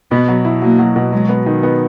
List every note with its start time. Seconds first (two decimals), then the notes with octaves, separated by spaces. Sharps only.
0.11 B2 B3
0.28 F#3
0.45 E4
0.62 F#3 A#3
0.79 F#3
0.96 B2
1.12 F#3 G#3
1.29 B3
1.46 D#3
1.63 B3